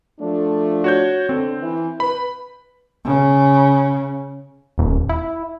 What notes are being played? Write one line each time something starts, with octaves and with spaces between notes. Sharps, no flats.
F3 A3 D4
F#4 C#5 G6
D3 C4
E3
B4 B5
C#3
D#1
E4